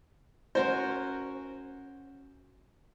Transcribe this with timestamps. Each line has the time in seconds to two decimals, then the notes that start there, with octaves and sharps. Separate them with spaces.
0.55 C#4 F#4 A#4 C5